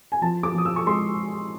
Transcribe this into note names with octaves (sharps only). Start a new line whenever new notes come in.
G#5
F3 A5
D6
F3 D#6
E6
C#6
G#3 C6